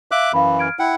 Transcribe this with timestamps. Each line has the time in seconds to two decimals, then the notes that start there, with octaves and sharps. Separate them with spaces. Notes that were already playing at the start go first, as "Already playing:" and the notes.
0.11 E5 F5 D6 F#6
0.33 F#2 E3 F5 B5
0.59 F6 G#6 D7
0.79 E4 F#5 G5